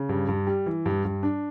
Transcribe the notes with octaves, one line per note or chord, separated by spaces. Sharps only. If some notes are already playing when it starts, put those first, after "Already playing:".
Already playing: C#3
G2
G2
G3
E3
G2
G2
D4